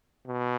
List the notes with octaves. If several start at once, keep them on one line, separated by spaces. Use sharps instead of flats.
B2